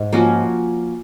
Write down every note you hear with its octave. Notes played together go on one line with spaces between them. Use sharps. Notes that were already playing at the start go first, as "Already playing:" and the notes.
Already playing: G#2
F3 A#3 C#4 F#4